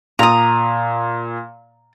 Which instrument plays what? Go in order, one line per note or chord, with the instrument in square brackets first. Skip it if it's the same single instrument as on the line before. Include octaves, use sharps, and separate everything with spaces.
[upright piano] A#2 [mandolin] A#5 D#6